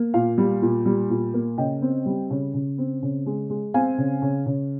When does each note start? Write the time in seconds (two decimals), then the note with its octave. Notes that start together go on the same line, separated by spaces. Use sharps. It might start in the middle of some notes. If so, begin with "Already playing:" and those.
Already playing: A#3
0.14 A#2 F5
0.38 G3
0.62 A#2
0.86 G3
1.10 A#2
1.34 A#3
1.58 C#3 D#5 G5
1.82 C4
2.06 G3
2.30 C#3
2.54 C#3
2.78 C4
3.03 C#3
3.26 G#3
3.50 G#3
3.74 C4 F5 G#5
3.98 C#3
4.22 C#3
4.46 C#3